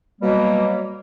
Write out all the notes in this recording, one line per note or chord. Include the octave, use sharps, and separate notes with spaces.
B2 F#3 G3 A#3